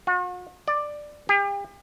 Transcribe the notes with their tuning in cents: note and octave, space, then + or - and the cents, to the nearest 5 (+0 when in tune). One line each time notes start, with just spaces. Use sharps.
F#4 -45
D5 +10
G4 +40